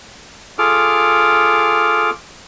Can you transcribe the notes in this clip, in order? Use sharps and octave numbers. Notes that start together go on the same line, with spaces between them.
F4 G#4 A4 D6 F6